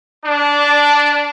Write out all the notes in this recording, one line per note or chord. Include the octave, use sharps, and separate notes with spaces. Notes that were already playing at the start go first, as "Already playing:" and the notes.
D4